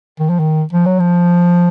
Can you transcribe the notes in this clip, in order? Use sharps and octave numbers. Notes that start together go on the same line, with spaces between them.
D#3
F3
D#3
F3
F#3
F3